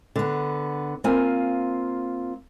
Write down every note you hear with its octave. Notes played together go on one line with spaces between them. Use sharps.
D3 B3
A#3 C4 F4 G#5